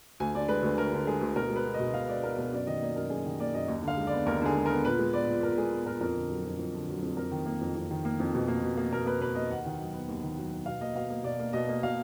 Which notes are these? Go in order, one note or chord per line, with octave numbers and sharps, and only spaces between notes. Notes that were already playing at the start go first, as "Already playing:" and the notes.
D2 G#5
D3 D5
G#3 B4
D2
D2 A#4
D3
G#3 G#4
D2
B2 A#4
G#3
B4
B3
D#5
B2
B2 F5
G#3 D5
B3 A#4
B2 A#4
F#2 D5
D#3 D#5
A#3 D5
F#2 A#4
F#2 G#4
D#3
A#3 D5
F#2 D#5
D#2
D3
F5
G#3
D5
B3
D#2 A#4
D3 G#4
G#3
B3 A#4
A#2 B4
G#3
B3 D5
A#2
A#2 A#4
G#3 G#4
B3
A#2 A#4
F2 A#4
D3
F#3
F2
F2
D3
F#3
F2
F2 A#4
D#3
A#3
F2
F2
D#3
A#3
F2
B2
A#3
B2
A#3
B2 A#4
A#3 B4
B2 B4
A#3 D#5
D#2 F#5
D#3
F#3
B3
D#2
D#3
F#3
B3
B2 F5
A#3 D#5
B2 F5
A#3
B2 D5
A#3
B2 D#5
A#3
B2 F5